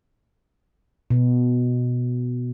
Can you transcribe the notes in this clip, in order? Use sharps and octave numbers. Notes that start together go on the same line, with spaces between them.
B2